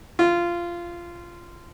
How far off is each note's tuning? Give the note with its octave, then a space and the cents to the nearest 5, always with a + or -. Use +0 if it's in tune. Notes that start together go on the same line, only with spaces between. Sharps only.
F4 -15